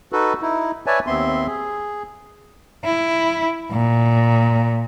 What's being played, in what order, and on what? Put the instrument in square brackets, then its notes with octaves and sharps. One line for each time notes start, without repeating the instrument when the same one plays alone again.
[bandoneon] D#4 F#4 A4 B4
D#4 E4
B4 C#5 D5 E5 G#5 A5
D#2 B3 C4 E5 C6
G#4
[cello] E4
A#2